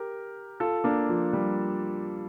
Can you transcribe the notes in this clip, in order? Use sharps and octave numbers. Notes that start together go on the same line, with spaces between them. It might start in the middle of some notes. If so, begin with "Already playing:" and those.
Already playing: G4 A#4
F4 A4
A#3 D4
F3
G3